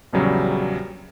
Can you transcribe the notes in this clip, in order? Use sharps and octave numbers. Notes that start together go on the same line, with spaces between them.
A#1 E2 C#3 F#3 G3